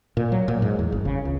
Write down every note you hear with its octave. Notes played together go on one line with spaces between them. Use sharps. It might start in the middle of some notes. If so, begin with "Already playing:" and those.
A#2
F#3
A#2
G#2
E2
G1
C#3
C#2